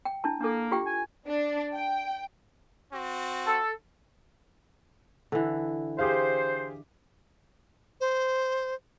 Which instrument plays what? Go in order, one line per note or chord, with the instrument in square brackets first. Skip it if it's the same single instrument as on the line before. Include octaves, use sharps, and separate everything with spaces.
[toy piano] G5
D4 E4 A5
[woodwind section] A#3 [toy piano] D4 A4
[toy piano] F4 G4 G5
[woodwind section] G#5
[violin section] D4
G5
[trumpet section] C4 F#4
[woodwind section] A4
[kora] D3 E3
[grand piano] G4 G#4 F5 [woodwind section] C5
[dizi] C5